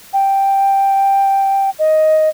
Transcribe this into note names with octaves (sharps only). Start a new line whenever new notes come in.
G5
D#5